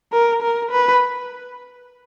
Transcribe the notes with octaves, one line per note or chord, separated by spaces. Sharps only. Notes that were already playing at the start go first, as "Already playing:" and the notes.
A#4
A#4
B4